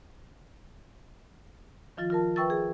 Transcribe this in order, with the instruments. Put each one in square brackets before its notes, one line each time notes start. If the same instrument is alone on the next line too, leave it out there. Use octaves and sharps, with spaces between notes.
[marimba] D#3 F3 F4 A6
F4 A#4 A5
B4 E5 G5 C#6 E6 A6
G#4